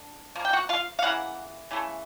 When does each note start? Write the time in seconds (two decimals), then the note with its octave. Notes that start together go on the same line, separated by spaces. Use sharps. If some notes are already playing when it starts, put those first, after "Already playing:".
Already playing: D3
0.36 F3 A#3
0.45 G5
0.53 F#4 F#5
0.69 F4 F5
0.99 F5
1.03 C#3 E3 A#3 F#5
1.71 C#3 E3 A3